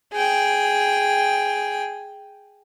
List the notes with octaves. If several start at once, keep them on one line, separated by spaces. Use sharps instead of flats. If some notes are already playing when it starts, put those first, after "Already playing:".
G#4 G5